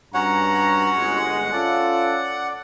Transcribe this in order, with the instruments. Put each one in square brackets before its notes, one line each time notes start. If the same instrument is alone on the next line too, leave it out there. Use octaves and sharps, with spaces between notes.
[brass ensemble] G2 A#5 [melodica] C#4 F#4 C#5 [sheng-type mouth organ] F#5
[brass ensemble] G1 G#3
[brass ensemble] C#4 F4 A4 [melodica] D5